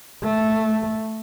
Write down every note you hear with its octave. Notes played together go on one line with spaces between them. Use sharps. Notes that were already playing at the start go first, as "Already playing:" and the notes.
A3